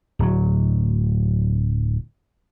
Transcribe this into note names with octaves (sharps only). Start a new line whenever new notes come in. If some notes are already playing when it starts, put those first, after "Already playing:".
D1 F#3